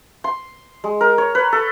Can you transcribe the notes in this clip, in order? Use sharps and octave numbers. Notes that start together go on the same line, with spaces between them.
C6
G#3
A#4
C#5
B4
A4